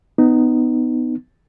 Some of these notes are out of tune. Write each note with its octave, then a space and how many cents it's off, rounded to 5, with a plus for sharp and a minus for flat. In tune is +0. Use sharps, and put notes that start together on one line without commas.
B3 +20 D#4 -10